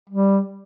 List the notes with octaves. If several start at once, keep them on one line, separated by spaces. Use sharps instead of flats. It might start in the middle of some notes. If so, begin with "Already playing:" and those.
G3